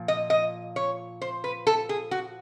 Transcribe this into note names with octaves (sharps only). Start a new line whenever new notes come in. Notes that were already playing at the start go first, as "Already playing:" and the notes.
Already playing: A#2 F3
D#5
D#5
C#5
C5
B4
A4
G#4
F#4